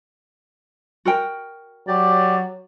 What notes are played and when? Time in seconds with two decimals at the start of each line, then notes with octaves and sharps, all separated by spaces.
1.05 F#4 A#4 G5
1.88 F#3 G4 D5